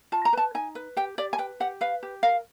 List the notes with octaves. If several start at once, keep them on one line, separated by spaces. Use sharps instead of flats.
F4 A5
A#5
B4 A5
D#4 G#5
B4
G4 G5
G4 D5
G#5
B4 G5
G4 F#5
B4 F5
G4
A#4 F5